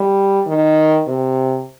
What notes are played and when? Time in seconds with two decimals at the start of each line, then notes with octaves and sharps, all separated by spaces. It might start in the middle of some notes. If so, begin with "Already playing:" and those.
Already playing: G3
0.47 D#3
1.07 C3